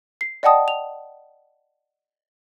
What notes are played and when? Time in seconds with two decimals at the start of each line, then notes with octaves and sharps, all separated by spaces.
0.21 C7
0.43 D5 D#5 F#5 G5 A5 D#6
0.68 F7